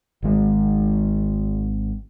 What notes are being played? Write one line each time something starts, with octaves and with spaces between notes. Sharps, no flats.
G#1 D#3 G#3